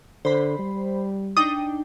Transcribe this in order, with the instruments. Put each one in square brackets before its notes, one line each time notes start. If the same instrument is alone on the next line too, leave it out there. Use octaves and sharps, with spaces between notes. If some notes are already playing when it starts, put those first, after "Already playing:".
[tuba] D3 [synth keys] C5 B5
[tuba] G3
[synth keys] D4 D#4 G5 [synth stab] D#6